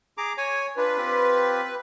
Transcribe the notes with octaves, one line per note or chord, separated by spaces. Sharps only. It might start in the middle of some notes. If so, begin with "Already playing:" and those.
G#4 A#5 D6
C#5 G#5
D4 F4 B4
C4 F4 G4